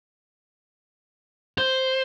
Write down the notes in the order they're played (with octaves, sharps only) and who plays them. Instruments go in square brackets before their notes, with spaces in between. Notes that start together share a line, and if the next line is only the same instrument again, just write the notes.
[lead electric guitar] C5